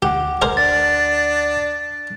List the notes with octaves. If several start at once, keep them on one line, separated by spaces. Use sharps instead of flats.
D2 G4 F#5 D6
G#4 A#4 C5
D4 A6